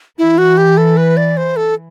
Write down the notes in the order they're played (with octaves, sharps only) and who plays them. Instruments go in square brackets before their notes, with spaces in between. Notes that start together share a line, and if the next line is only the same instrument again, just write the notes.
[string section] E3 [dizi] E4
[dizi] F#4
G4
A4
B4
D5
C5
A4